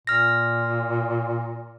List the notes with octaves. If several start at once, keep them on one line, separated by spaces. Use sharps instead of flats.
A#2 F6 A#6